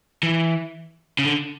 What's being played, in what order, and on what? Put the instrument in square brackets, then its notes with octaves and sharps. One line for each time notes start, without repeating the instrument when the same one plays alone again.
[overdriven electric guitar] E3
C#3
D3